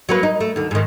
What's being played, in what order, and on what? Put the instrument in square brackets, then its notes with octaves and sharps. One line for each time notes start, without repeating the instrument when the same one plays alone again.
[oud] F#3 A#3 B4
D#4
A3
D#2 D3
G#2 D#3